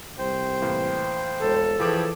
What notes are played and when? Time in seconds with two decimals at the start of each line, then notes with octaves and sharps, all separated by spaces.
0.18 C2 C5 G5
0.62 A2 E3 A#3
1.40 E1 A4
1.79 E3 F3 G#4 C#5 G5 B5 D6